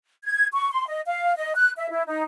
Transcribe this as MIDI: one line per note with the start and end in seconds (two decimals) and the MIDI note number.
0.24 0.46 92
0.52 0.71 85
0.71 0.86 84
0.87 1.01 75
1.06 1.34 77
1.36 1.53 75
1.55 1.70 90
1.77 1.89 76
1.90 2.02 64
2.06 2.21 63